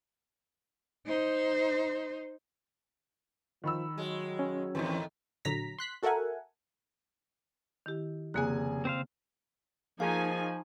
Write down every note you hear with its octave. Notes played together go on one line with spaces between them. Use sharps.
D#4 C5
D#3 F3 B5 E6
F#3 G#3
C#4
E2 A2 D#3 E3 C4
A#1 D3 F#3 A#5 B6
C6 F#6 B6
F#4 A4 A#4 E5 F#5 G#5
D#3 E4 G4
F1 C#3 A#3 G#4 G#5 F#6
C4 C5 F5
F3 A#3 D#4 F4 G#4 F5 G#5 C#6